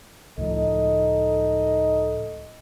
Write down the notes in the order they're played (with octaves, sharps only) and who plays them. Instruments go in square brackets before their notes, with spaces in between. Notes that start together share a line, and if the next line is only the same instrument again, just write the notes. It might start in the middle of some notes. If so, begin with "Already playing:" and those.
[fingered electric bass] C#2 A2 F3 [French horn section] D#4 A4 D#5